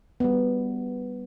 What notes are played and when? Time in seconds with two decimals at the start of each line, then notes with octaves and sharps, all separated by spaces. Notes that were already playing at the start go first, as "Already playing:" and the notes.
0.20 G3 B3